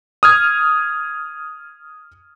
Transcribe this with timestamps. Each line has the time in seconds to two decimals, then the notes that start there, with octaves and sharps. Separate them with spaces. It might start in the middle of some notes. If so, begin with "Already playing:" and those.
0.23 D#6 F6 G#6